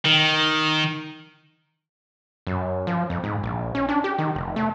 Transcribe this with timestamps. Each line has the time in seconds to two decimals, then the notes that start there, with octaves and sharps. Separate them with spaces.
0.05 D#3
2.47 F#2
2.87 F3
3.10 F2
3.24 G#2
3.43 A#1
3.75 C#4
3.89 D4
4.04 G4
4.19 D#3
4.35 F1
4.56 A3